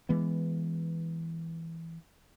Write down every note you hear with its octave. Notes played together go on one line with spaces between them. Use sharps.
E3 G#3 B3